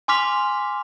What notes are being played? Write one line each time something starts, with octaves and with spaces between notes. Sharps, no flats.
G#5 C6 D6 F6 B6 F7